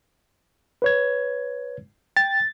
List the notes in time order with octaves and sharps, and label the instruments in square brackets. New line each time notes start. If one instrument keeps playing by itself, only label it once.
[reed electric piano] B4 C#5 G#6
[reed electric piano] G5 [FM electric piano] A6